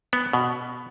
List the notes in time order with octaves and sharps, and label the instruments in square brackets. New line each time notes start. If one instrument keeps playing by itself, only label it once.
[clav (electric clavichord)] B3
B2